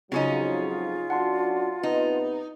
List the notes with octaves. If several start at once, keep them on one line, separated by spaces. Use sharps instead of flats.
F2 G#2 C#3 F#3 C#4 D#4 F4
F#2 D4 F#4 F#5 A5 C6
C3 B3 D#4 B4